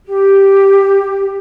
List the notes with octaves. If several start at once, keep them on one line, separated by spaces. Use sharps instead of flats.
G4